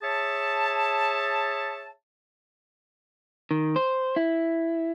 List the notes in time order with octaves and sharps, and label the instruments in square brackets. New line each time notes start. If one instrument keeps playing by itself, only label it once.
[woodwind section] G#4 C#5 E5 A5
[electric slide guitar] D#3
C5
E4